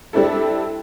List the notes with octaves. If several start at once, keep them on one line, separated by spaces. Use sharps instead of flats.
G3 C4 D4 E4 A4